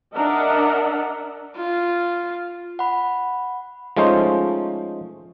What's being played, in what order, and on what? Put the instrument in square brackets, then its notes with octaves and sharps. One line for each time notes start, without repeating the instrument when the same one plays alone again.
[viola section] D4 A#4 D#5 E5 F#5
[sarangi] F4
[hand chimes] F#5 B5
[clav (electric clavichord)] F3 G#3 A3 C#4 D#4 C5